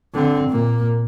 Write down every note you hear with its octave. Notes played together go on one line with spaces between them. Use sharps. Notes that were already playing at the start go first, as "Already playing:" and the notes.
D3 C4
A#2 A#3